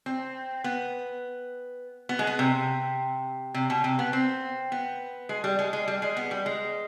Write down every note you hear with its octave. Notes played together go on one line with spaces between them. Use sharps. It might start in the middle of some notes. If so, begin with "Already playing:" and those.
C4
B3
B3
G#3
B3
C3
C3
B2
C3
B3
C4
B3
G#3
G3
G#3
G#3
G3
G#3
B3
G3
G#3